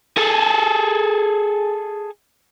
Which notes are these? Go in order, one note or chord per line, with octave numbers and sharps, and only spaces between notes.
G#4 A4